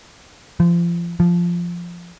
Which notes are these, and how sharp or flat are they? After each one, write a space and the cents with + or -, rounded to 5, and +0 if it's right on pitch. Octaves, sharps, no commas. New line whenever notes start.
F3 -30
F3 -5